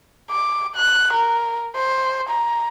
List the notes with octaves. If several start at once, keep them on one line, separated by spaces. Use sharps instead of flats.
D6
F#6
A#4
C5
A#5